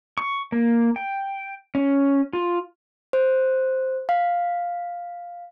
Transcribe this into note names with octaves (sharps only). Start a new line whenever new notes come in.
C#6
A#3
G5
C#4
F4
C5
F5